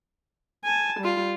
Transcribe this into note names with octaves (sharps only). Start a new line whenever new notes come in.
G#5 A5
G3 F4